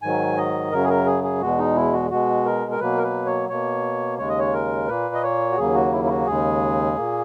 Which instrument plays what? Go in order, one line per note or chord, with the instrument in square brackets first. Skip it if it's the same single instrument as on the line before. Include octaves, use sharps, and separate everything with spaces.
[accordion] G#2 D#3 F#3 G#5
D#5
F#2 C#3 F#3 A#4
G#4
A#4
G#4
G#4
E2 B2 G#3 F#4
D#4
E4
F#4
B2 G#3 F#4
A#4
A#4
B2 F#3 A#3 B4
A#4
B4
C#5
B2 A#3 C#5
D#2 C#3 G#3 C#5
D#5
C#5
A#4
A#2 A#3 B4
D#5
C#5
F#4
D#2 C#3 F#3 A#3 G#4
F#4
E4
E4
F#4
D#2 C#3 G#3 G#4
A#2 A#3